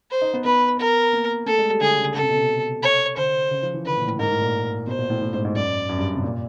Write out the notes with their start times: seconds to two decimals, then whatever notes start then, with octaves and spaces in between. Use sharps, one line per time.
0.11 C5
0.22 D#4
0.34 B3
0.45 B3 B4
0.79 A#4
1.13 A#3
1.46 A3 A4
1.58 G#3
1.70 G3
1.81 D3 G#4
1.98 C#3
2.14 C#3 A4
2.23 C3
2.30 B2
2.39 C3
2.83 C#5
3.17 D3 C5
3.51 C#3
3.63 F3
3.74 E3
3.85 D3 B4
3.97 A#2
4.07 A2
4.19 G#2 A#4
4.31 A2
4.42 A#2
4.87 B2 C5
4.99 A#2
5.10 A2
5.22 A2
5.33 G#2
5.45 G#2
5.56 F#2 D5
5.89 F#2
5.98 G2
6.15 C3
6.24 A#2